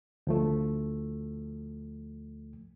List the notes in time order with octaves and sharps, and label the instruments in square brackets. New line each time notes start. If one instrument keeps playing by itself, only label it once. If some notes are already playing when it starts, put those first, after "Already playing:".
[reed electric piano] D2 F3 A3